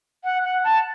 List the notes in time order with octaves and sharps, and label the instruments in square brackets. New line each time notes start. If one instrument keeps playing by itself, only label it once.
[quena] F#5
F#5
A5